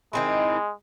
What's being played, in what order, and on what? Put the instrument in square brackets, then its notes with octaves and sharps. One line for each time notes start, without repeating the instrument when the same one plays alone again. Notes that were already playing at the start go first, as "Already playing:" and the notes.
[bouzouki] D#3 C4 E4 [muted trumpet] G#3